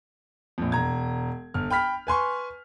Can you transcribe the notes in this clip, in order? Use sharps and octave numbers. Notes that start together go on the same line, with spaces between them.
A#1 F2
E1 A#5 G#6
G1 F6
G5 B5 F6 B6
B4 G#5 C6 C#6